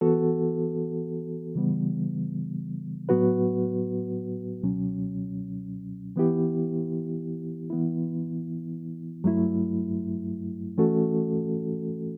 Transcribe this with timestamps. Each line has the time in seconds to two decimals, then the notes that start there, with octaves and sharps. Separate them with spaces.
0.01 E3 B3 F#4 A4
1.55 C#3 E3 G3 B3
3.09 A2 F#3 B3 F#4 B4
4.62 C#2 B2 F#3 C#4
6.16 E3 B3 E4 G4
7.70 E3 B3 E4
9.24 G2 F#3 A3 E4
10.78 E3 A3 C#4 F#4 A4